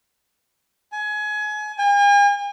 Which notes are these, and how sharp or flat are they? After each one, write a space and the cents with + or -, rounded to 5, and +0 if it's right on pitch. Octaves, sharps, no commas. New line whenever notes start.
G#5 +25
G#5 -45